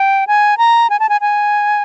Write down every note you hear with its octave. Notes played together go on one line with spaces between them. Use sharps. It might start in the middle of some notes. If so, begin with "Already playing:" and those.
Already playing: G5
G#5
A#5
G#5
A5
G#5
G#5